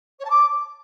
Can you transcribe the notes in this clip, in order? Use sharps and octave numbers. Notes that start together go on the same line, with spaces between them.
C#5
A5
D6